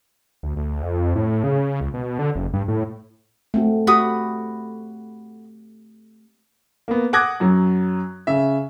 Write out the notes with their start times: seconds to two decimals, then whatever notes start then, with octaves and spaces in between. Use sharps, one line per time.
0.43 D2
0.56 D2
0.83 F2
1.16 A2
1.44 C#3
1.81 C#2
1.94 B2
2.19 D3
2.35 F#1
2.53 G2
2.68 A2
3.54 A3 C4 F#4
3.87 F#4 G4 B5 D#6
6.88 A#3 B3
7.13 F#5 D6 D#6 F#6 G#6 A#6
7.40 F#2 F#3
8.27 C#3 E5